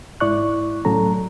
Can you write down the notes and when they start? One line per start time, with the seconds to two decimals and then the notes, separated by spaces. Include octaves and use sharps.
0.20 G#2 E4 D5 C#6 F#6
0.85 A2 F#3 C#4 A4 A#5